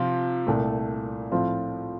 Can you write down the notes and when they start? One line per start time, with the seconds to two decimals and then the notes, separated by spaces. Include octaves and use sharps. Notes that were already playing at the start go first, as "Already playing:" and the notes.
Already playing: C3 F3 C4 F4
0.47 C2 A#2 A3
1.32 A2 F3 C4 F4